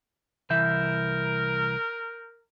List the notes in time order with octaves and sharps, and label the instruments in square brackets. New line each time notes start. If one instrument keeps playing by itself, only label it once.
[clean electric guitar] C2 E3 E5 [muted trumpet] A#4 [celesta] G6